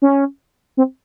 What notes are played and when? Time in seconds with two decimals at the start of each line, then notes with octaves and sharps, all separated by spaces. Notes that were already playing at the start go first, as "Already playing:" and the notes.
0.02 C#4
0.77 C4